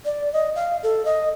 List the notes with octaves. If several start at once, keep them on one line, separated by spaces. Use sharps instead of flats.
D5
D#5
F5
A4
D#5